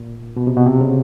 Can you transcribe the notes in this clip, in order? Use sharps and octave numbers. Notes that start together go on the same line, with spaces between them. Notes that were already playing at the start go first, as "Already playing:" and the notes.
Already playing: A#2
B2
C3
B2
C3
C#3